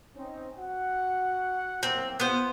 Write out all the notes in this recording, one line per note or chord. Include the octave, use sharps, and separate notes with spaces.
C4 C#4 D#4
F#4 F#5
C2 F#2 A#3 C4
B3 F4 C5